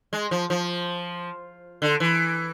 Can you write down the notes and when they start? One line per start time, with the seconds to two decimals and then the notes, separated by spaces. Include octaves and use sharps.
0.13 G#3
0.31 F3
0.50 F3
1.82 D3
2.00 E3